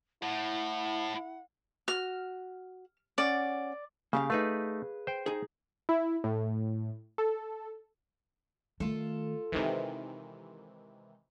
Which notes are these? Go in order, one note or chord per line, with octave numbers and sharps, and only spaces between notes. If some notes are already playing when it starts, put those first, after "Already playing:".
A2 E4 F#5
F#4 F6
C#4 D5 F#5
C#3 A#3 G4 F5
A3 D#4 G#4 B4 F5
C5 G5
D#4 G#4
E4
A2
A4
D#3 A3 F4 A4
C3 D#3 E3 G#3 D#4